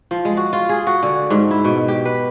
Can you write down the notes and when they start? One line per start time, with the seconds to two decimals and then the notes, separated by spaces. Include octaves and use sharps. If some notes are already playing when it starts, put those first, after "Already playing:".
0.11 F3
0.25 G#3
0.37 F#4
0.53 F4
0.69 G#4
0.87 F#4
1.03 D3
1.30 G#2
1.51 E4
1.64 B2
1.88 G4
2.05 B4